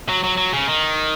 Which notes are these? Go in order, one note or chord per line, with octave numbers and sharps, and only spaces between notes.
F#3
F#3
F#3
C#3
D#3